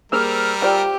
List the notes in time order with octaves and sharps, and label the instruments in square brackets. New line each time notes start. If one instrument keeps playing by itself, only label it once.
[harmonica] G3 A#4 [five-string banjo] A#3 G#4 C5 [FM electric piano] E6 F6
[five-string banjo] F4 C5 D5 [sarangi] G4